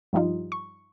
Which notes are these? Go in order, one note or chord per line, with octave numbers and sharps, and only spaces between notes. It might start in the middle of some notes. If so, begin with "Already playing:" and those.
G2 F3 G3 D#4 F4
C#6